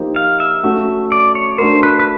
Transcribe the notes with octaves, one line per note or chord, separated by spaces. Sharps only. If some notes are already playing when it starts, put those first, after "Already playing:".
Already playing: F3 A#3 D#4 G4 C5
F5
E5
A3 C#4 F#4
D5
C#5
A3 D4 F#4 A#4 C5
B4
B4